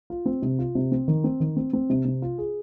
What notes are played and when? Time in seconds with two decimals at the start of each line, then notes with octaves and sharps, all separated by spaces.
0.10 F4
0.26 C4
0.42 C3
0.59 F4
0.75 C3
0.92 C4
1.08 D#3
1.24 C4
1.40 D#3
1.57 C4
1.73 C4
1.90 C3
2.05 C3
2.22 F4
2.38 G#4